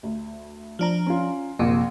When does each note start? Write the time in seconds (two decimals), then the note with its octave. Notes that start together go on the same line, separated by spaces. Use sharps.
0.03 D2
0.79 F3 D4 A#5
1.07 C#4 F4
1.59 A#1 F#2 C3 A#3